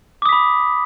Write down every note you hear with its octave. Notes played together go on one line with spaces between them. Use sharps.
B5 D6 D#6 B6